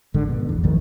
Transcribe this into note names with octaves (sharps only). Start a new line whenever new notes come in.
G#1 G#2 D3
B2
F1 E2
G#1 D#2 D#3 F3